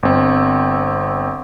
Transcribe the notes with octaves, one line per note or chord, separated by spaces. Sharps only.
G1 C4